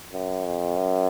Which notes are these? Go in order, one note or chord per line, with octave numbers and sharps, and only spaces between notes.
F#2
F2
F#2